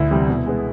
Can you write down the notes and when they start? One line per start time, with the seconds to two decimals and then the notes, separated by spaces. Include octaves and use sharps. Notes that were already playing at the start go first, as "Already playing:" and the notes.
Already playing: D2 E4
0.11 C3 E3 G3
0.29 B2
0.46 G#3 B3